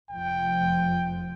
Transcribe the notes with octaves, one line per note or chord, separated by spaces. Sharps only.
F1 F3 G5